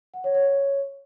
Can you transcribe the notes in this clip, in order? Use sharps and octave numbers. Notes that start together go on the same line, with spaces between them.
F#5
C#5
C#5